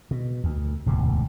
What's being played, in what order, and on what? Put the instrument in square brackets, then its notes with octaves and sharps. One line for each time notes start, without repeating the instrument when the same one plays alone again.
[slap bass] B2
D2
E1 D2 G#2 C3